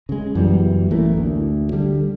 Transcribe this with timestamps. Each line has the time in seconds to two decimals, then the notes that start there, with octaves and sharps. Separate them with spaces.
0.09 C#3 G#3
0.35 F#2 E3 G3 B3
0.90 A1 E3 A3 A#3
1.17 D2
1.73 D3 G3